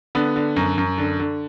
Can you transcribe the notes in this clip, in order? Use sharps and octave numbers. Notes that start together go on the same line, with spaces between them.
D3 B3
D3
F#2
F#2
D3
D3